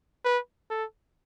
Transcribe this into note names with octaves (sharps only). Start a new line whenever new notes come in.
B4
A4